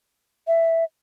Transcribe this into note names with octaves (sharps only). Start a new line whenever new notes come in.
E5